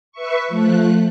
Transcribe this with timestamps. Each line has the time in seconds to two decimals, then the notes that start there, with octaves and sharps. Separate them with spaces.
0.12 B4 E5 C#6
0.48 F3 A3 F#6